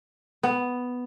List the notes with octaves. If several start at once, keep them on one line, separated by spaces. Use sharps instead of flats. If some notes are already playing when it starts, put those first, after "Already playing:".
B3